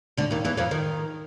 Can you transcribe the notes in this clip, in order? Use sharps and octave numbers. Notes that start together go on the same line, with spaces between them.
D2 D3
D#2 D#3
E2 E3
F2 F3
D#3